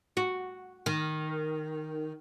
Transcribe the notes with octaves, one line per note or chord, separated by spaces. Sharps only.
F#4
D#3